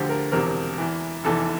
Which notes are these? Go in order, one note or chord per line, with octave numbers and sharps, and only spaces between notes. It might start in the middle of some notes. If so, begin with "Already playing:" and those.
Already playing: D2 D3 F3 G4
A#4
E1 E2 C3 F3 A#4
E2 E3
F1 E2 E3 A4